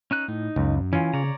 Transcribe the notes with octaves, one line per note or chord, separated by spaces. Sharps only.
C#4 D#4 F#6
A2 D#4
C#2 F#2
E3 C#4 F4
C#3 C#5 D5 A#5